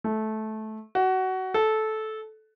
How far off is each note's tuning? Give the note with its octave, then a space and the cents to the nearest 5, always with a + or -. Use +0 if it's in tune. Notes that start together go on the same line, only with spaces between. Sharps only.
A3 -15
F#4 +20
A4 -15